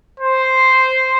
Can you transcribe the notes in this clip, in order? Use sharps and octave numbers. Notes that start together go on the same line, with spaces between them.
C5